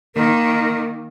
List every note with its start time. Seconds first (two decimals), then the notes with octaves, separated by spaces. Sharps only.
0.15 D#3 A#3 A#4